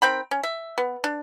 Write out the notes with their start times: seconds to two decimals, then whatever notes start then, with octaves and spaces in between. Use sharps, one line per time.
0.02 D#3 C4 G5 B5
0.31 C#4
0.43 E5
0.78 B3
1.04 D4